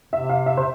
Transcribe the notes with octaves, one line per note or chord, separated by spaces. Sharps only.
C3 E5
F5
E5
C3 C5